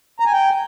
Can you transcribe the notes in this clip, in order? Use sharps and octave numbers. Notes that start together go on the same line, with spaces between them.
A#5
G#5
G5